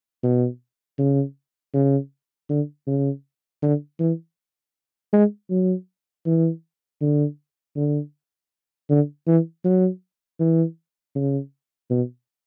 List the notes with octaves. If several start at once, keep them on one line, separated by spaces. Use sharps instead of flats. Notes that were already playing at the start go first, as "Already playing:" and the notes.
B2
C#3
C#3
D3
C#3
D3
E3
G#3
F#3
E3
D3
D3
D3
E3
F#3
E3
C#3
B2